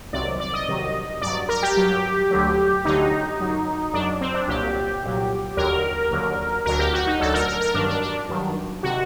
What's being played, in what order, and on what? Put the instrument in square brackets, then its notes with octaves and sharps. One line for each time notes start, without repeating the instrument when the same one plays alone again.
[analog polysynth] C2 C3 D#3 F#3 D5
D5
D#5
C2 C3 D#3 F#3
G2 F#3 D5
A#4
G4
G2 F#3
D2 D3 F#3
D2 D3 F#3 D#4
F#2 F#3
F#2 F#3 D4
C4
D4
C2 A#2 F#3 G4
C2 A#2 F#3
D#2 D3 F#3 A#4
D#2 D3 F#3
D2 D3 F#3 A#4
G4
F#4
D#4
D2 D3 F#3 A4
A#4
A#4
A#4
G2 D#3 F#3 D4
D4
D4
G2 D#3 F#3
C3 D#3 F#4